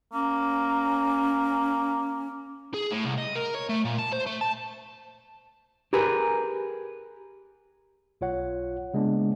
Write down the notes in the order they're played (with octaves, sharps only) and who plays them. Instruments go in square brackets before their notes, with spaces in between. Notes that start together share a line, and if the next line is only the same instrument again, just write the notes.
[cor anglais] A#3 [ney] C#4
[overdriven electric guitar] G#4
A2
C2
D#5
A#4
C#5
A3
A#2
A5
C5
A3
A5
[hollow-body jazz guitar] G4 G#4 A#4 B4
[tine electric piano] B1 F4 C#5 F#5
C#3 G#3 A#3 B3 D4